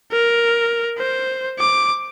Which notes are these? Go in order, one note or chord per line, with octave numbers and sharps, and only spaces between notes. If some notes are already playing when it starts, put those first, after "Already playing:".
A#4
C5
D6